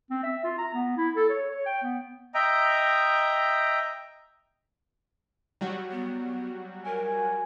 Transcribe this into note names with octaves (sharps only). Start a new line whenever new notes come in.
C4
E5
F4
A#5
B3
E4
A4
C#5
C#5
G5
B3
D#5 E5 G5 A#5
F#3 G3 F#4
B3
A#4 G#5